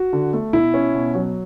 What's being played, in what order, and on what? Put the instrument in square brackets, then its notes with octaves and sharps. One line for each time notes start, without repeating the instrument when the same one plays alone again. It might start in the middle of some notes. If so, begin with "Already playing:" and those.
Already playing: [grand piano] F#4
[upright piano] D3
A3
[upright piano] B2 [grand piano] E4
[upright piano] C#4
B2
F#3